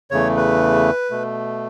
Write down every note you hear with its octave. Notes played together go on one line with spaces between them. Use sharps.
E2 C#3 E3 A3 C#5
B4
B2 A3